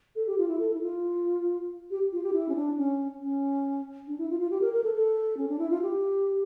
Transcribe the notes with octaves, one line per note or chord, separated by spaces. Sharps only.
A4
G4
F4
E4
A4
E4
F4
G4
F4
G4
E4
C#4
D4
C#4
C#4
D4
E4
F4
F4
G4
A#4
A#4
A4
A4
C#4
D4
E4
F4
G4